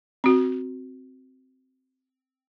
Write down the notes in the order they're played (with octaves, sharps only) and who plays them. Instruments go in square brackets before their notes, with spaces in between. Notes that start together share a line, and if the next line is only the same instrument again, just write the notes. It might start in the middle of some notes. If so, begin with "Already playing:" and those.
[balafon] C4 F#4